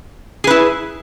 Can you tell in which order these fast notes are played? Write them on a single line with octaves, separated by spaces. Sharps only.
G#4 B4 E4